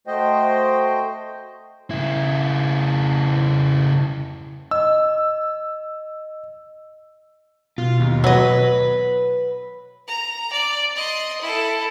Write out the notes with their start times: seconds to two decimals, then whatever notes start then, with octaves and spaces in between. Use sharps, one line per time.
0.07 A3 F#4 C5 D#5 G5
1.91 C#3 E4
4.71 D#5 E6
7.78 B2 F4
8.00 D#2
8.24 F#3 B4 D#5
10.08 A#5
10.53 D5
10.96 D#5 C6
11.41 E4 A4